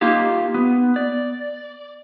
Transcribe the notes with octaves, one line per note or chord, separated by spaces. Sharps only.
A#3 D#4 F4 G4
B3
D5